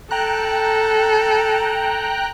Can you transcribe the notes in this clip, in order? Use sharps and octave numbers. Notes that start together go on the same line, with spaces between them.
A4 G5 A#5 F#6